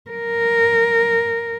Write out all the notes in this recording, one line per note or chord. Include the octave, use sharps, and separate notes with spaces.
A#4